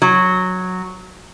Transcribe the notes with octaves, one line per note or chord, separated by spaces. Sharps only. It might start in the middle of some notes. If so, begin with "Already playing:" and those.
F#3